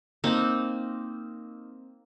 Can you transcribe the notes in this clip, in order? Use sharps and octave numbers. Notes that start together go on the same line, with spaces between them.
A#3 C4 D#4